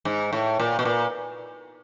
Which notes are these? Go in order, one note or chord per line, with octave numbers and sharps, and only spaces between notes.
G#2
A2
A#2
B2
A#2